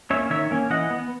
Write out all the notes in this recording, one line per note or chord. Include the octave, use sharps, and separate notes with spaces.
A#3 C#4 C#5 E5
D#3 C#5 E5
A#3 C#4
E3 D#5 F#5
B3